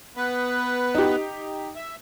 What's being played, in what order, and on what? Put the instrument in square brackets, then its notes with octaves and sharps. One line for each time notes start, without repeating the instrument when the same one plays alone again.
[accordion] B3 B4
[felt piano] D#4 G4
[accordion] E5